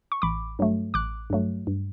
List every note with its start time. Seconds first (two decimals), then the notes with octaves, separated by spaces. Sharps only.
0.12 C#6
0.22 A1 B5 D6
0.59 G2 F#3 A3
0.94 A1 D6 F#6
1.30 G2 F#3 A3
1.67 G2